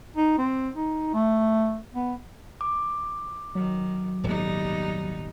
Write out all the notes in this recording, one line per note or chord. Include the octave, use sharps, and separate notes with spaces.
D#4
C4
D#4
A3
B3
D6
D#3 F#3
D#1 G#1 G3 B3 D#4